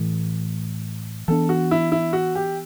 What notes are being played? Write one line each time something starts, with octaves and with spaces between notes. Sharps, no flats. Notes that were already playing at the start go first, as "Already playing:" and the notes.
Already playing: A2 E3 A3
E3 B3 D4 A4
F#4
E4
E4
F#4
G4